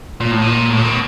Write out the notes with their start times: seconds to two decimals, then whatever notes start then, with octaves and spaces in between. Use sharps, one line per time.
0.20 A#2
0.31 A2
0.42 A#2
0.70 A2
0.77 A#2
0.85 B2